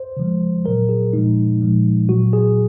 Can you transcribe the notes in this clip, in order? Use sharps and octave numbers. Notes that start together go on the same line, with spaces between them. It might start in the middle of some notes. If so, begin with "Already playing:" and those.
Already playing: C5
C#3 F3 G#3
A#2 F#3 A#4
G#4
A#2 F3 G#3 D#4
A#2 F3 G#3
A#2 F#3 F#4
G#4